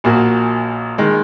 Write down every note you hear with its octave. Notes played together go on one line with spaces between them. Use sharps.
A#1 A#2 A#3 F#4
D#3 G#3